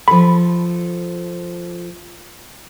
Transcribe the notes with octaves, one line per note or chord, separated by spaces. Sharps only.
F3 A4 B5